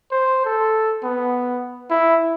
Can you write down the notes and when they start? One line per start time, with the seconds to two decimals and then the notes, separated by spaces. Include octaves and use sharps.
0.12 C5
0.45 A4
1.04 B3
1.90 E4